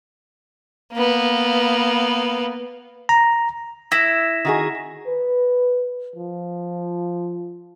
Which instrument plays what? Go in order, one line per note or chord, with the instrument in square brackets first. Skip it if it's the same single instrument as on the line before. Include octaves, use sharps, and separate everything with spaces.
[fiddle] A#3 B3
[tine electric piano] A#5
[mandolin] E4 [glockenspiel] A#6 B6 E7
[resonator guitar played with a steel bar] D#3 F#4 G#4
[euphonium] B4
F3